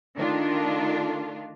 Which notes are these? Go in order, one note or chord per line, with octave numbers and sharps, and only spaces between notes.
D#3 A3 D4 F4